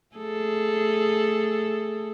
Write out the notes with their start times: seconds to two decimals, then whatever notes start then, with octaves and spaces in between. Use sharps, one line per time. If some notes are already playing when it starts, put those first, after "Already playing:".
0.16 A3 G#4 A4